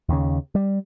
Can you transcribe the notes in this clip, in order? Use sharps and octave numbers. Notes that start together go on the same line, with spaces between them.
D#2 C#3
G3